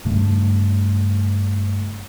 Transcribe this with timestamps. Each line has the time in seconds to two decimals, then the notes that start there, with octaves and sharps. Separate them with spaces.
0.05 G2 C#3 G3 A3